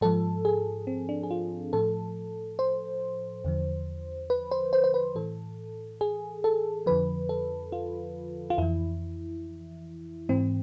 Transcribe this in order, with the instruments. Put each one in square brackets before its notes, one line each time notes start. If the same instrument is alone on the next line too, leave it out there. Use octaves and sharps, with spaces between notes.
[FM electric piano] G#2 F3 A4
G#4
C4
D4
G#4
F4
A2 F3 A4
C5
E2 D3 F3
B4
C5
C5
C5
B4
A2 E3 A4
G#4
A4
F2 D3 F3 B4
A4
F4
F4
F2 E3 E4
G#2 E3 C4